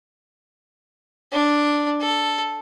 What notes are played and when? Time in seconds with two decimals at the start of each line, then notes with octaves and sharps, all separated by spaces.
1.33 D4
2.01 A4